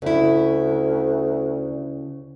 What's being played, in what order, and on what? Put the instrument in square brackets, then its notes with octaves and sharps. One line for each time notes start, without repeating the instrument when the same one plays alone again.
[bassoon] D2 [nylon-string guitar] C#3 E4